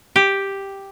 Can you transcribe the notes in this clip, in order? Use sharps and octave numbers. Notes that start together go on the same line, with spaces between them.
G4